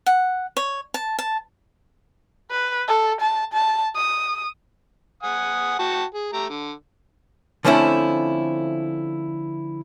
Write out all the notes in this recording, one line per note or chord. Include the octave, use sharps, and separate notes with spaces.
F#5
C#5
A5
A5
B4
A4
A5
A5
D#6
F#5 G#5 D#6
F#4 G5 A5
G#4
A3 G4 A#5
D3
D3 F3 A3 C4 C#4 E4